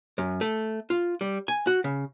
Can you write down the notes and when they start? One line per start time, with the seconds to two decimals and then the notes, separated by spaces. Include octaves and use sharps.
0.18 F#2
0.41 A3
0.90 F4
1.21 G3
1.48 G#5
1.67 F#4
1.84 C#3